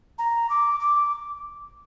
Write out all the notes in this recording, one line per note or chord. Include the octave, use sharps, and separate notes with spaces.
A#5
D6
D6